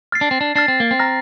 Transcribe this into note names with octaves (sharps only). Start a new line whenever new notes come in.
F6 A6 C7
D4
C4
D4
D4 F6 A6 C7
C4
A#3
C4
A#5 F6 A#6